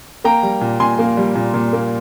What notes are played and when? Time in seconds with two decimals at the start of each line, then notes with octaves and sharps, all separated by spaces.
0.24 A#3 G5 A#5
0.43 G3
0.61 A#2
0.80 A#2 G#5 C6
0.99 A#3
1.17 G3
1.35 A#2
1.54 A#2
1.73 A#3